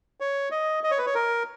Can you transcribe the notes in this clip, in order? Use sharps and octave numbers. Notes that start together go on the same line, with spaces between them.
C#5
D#5
D#5
C#5
B4
C#5
A#4